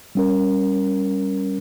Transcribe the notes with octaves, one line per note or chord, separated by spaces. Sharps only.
G3 C#4 A#4